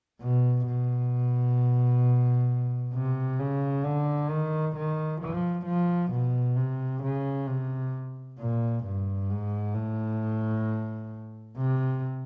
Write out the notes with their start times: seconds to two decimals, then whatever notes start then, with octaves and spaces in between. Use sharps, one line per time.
0.21 B2
0.66 B2
2.94 C3
3.39 C#3
3.84 D3
4.30 D#3
4.76 D#3
5.21 F3
5.66 F3
6.11 B2
6.56 C3
7.03 C#3
7.47 C3
8.39 A#2
8.84 G2
9.30 G#2
9.74 A2
11.57 C3